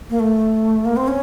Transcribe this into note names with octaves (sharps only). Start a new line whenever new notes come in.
A#3
A3
A#3
C4
C#4